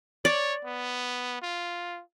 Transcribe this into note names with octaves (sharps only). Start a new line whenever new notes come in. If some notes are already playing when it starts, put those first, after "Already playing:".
C#5 D5
B3
F4